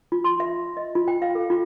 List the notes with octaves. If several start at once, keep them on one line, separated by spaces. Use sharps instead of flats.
F4
C6
E5
D#5
F4
G5
F5
A4
F4